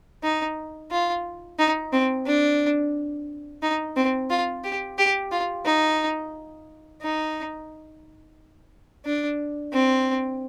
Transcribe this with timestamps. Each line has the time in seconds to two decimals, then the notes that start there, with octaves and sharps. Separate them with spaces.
0.23 D#4
0.91 F4
1.59 D#4
1.93 C4
2.27 D4
3.62 D#4
3.96 C4
4.30 F4
4.64 G4
4.98 G4
5.32 F4
5.65 D#4
7.02 D#4
9.05 D4
9.73 C4